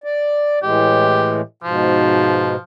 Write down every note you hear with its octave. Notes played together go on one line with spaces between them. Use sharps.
D5
A2 E3 G#3 G4
G#2 B2 F3